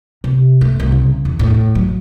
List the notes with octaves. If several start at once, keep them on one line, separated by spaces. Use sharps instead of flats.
C3
A3
C2
C#3
E2
A2
F#3